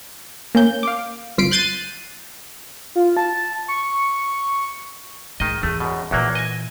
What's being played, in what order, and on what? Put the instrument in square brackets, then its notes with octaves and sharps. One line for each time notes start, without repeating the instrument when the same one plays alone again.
[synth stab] A#3 C#4 G6
F5 D6
G1 C2 F4 B6 C7 D7
F#6 G6 A6 C7 D#7
[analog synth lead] F4
A5
C#6
[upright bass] G#2 [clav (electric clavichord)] D#3 D#5
[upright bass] E2 [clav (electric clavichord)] A3
[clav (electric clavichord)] F#2 B2
[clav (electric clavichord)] E2 F#3 A#3 [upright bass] A#2 E3
[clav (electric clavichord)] D#5 G#5